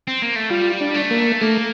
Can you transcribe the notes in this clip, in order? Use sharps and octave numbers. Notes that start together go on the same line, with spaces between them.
C4
A#3
A3
G3 F4
D4
A3
A#3
A3 A#3